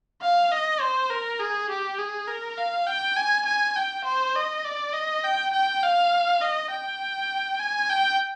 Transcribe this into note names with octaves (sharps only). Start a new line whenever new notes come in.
F5
D#5
C5
A#4
G#4
G4
G#4
A#4
F5
G5
G#5
G#5
G5
C5
D#5
D5
D#5
G5
G5
F5
D#5
G5
G#5
G5